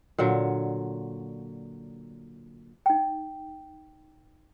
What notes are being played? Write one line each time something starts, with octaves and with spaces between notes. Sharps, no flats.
A#2 D3 F#3
D#4 G5